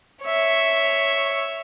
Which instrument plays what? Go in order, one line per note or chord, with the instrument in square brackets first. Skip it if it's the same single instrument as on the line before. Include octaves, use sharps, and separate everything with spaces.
[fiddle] C#5 E5